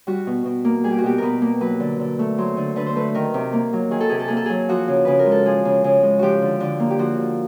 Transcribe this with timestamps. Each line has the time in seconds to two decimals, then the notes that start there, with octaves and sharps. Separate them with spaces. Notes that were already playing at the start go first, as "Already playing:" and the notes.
0.07 G3 F#4
0.27 B2
0.46 B2
0.65 A#3
0.84 G3 G#4
0.91 G4
0.98 F#4
1.04 B2 G4
1.18 B2 A#4 B4
1.42 A#3
1.61 F#3 B4
1.80 D3
2.00 D3
2.19 A3
2.38 F#3 C5
2.57 D3
2.76 D3 B4
2.86 C5
2.96 A3 B4
3.15 D#3 A#4
3.34 C3
3.53 A#3
3.73 F#3
3.91 D#3 G#4
4.00 A4
4.09 C3 G#4
4.19 A4
4.28 A#3 G#4
4.37 A4
4.46 F#3 G#4
4.69 F3 F#4
4.88 C#3
5.05 C#3 B4
5.19 A#4
5.26 G#3
5.32 A4
5.45 F3 G#4
5.65 C#3
5.84 C#3
6.03 G#3
6.19 F3 F#4 G4
6.42 D3
6.60 D3
6.80 A#3
6.90 G4
6.99 F3 F#4
7.19 D3